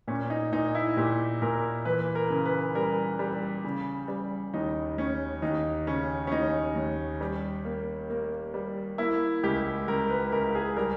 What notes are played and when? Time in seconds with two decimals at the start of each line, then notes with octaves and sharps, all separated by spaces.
0.08 A#2 C#4
0.30 D#4
0.52 A#2 D#4
0.75 E4
0.97 A#2 G4
1.42 A#2 A#4
1.85 E3 B4
2.15 A#4
2.30 C#3
2.46 B4
2.75 G3 A#4
3.19 G3
3.64 C#3
4.08 G3
4.54 D#2 D#4
4.98 D#2 C#4
5.42 D#2 D#4
5.87 C#3 C#4
6.27 C#4
6.32 D#2 D#4
6.76 D#2
7.21 G3
7.65 A#3
8.10 A#3
8.54 G3
8.98 A#3 E4
9.43 C#2 G4
9.88 C#2 A#4
10.09 B4
10.32 C#2 A#4
10.55 G#4
10.77 G3 A#4